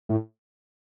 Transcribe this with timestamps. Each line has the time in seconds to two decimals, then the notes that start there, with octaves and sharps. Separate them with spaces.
0.09 A2